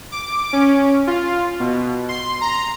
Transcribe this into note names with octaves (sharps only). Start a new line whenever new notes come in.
D6
C#4
F4
B2
C6
A#5